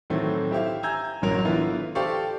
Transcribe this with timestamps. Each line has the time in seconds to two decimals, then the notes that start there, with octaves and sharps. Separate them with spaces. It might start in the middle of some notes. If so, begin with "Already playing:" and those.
0.10 A2 D#3 E3 F#3 A3 C4
0.51 E4 G4 C5 E5 F5
0.83 G#5 A#5 E6 G6 G#6
1.22 D1 A1 F#2 F#3 A#4 F7
1.45 D3 E3 B3 E4 F4
1.95 G4 A4 C5 D5 F5 C#6